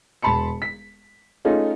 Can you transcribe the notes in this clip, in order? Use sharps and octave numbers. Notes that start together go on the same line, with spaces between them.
E1 A5 B5 C6 C#7
B6
A3 C#4 D#4 F4 G#4